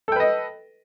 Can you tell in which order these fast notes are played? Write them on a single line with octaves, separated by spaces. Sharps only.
A4 G5 B4 D#5